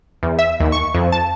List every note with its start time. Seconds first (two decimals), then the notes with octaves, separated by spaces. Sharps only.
0.23 E2
0.39 E5
0.60 D#2
0.72 C#6
0.94 F2
1.12 A5